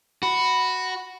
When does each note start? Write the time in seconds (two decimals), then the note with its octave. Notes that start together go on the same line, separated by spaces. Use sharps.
0.23 F#4 B5